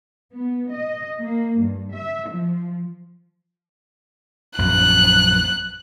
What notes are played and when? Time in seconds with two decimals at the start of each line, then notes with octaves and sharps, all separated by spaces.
0.32 B3
0.70 D#5
1.20 A#3
1.60 G2
1.92 E5
2.28 F3
4.59 A#1 F#2 F#3 F#6